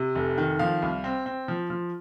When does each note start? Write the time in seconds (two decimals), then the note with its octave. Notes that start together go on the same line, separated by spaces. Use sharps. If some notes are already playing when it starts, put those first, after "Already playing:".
Already playing: C3
0.15 F1
0.38 D#3
0.59 F3 F5
0.82 C2
1.04 C4
1.26 C4
1.48 F3
1.70 F3